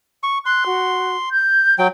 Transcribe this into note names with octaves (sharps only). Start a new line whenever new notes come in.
C#6
C6 F#6
F#4
G6
F#3 G5